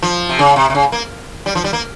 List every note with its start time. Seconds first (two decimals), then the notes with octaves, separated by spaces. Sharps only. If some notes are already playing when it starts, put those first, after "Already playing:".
0.02 F3
0.29 C3
0.39 C#3
0.56 C3
0.70 C3
0.75 C#3
0.92 A#3
1.46 G3
1.55 F3
1.64 G3
1.73 A#3